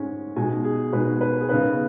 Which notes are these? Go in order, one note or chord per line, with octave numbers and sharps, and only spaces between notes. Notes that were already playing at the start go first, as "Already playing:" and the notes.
Already playing: G#2 G#3 C#4
B2 G#3 D#4 G#5
G#4
B2 G#3 D#4 B4
B4
G#4
C#3 B3 D#4 B4